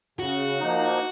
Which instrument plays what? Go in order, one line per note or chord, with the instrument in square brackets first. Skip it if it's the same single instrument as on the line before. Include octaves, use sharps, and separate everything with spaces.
[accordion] C#3 [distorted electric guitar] F#4
[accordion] F3 A#3 D#4